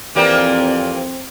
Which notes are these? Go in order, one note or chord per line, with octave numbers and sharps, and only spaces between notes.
F2 E3 A#3 C4 G4 D5